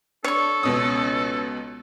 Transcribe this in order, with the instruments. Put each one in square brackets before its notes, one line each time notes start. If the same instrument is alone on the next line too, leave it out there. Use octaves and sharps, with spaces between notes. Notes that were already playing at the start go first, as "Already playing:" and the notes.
[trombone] D4 [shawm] A4 [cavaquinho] C#5 C#6
[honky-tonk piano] C#2 B2 D#6 [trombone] C#4